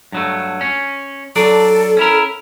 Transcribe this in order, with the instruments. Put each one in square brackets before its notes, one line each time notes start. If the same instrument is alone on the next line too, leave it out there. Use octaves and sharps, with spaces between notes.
[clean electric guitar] G2 F#3 A3
C#4
[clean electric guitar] F#3 D4 D5 [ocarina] A4
[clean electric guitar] C#4 E4 A#4